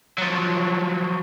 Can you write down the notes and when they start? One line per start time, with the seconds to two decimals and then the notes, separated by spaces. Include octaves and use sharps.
0.18 F3 F#3